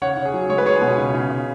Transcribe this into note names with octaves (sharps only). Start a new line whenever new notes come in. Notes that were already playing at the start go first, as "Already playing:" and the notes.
C#3 C#5 F#5
C#3
G#4
F#3
G#3 C#5
B4
G#3 G#4 C#5
B2
C#3
C#3
C#3